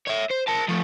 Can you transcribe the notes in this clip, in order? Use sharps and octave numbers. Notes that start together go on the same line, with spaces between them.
C#5 E5
C5
A#4 A5
F3 A3